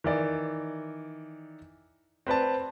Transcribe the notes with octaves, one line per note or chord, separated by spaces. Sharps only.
D#3 E3 D5
C4 B4 D5 A5